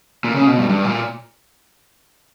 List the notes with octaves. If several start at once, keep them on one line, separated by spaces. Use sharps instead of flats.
A#2
C#3
B2
G2
G2
A#2